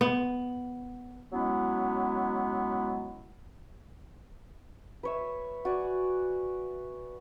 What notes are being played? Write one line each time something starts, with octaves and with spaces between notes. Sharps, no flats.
B3
F#3 G#3 B3 C#4 E4
B4 C#5 E5
F#4 D5 G#5